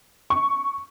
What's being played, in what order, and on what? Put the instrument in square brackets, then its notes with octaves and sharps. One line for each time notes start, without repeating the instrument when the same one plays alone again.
[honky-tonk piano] C#6